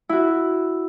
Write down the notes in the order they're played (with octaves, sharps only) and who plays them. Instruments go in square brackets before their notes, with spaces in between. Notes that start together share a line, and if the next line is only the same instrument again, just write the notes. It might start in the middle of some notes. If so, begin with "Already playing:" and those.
[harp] E4 F#4